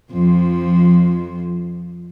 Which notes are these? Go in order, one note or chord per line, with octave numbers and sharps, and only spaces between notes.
F2 F3